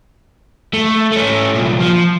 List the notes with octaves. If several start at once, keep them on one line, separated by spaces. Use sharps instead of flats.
A3
A3 C#4
C2 A#2
F3